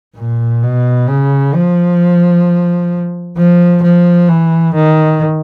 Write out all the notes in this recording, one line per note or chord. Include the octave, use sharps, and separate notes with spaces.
A#2
B2
C#3
F3
F3
F3
E3
D#3